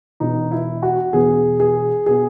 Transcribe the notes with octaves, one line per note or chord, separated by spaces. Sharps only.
E1 E2 B2 D#4
E4
F#4
E1 E2 B2 G#4
G#4
B2 G#4